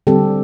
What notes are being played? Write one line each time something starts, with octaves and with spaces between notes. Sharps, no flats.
D3 G3 C4 G4 A4